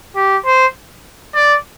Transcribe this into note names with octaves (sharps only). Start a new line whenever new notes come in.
G4
C5
D5